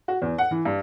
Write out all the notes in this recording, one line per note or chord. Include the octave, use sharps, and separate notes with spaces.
F#4
E2
F#5
E3
G2